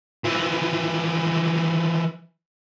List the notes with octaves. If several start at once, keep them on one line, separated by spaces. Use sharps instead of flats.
E3 F3